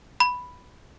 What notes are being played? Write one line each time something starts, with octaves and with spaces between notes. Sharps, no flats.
B5